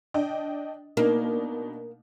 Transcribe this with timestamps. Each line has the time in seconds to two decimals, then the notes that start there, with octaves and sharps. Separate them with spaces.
0.14 D4 D#5 G5
0.97 B2 A#3 D4 D#4